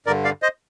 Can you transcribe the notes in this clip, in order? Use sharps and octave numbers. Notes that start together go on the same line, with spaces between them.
G2 D3 A#4 D5
D5 F5
C5 D#5